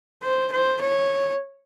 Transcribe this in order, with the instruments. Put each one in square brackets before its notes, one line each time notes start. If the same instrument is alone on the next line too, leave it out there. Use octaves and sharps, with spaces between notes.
[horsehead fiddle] C5
C5
C#5